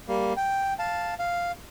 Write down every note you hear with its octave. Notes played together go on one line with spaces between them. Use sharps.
G3 A#3
G5
F5 A5
F5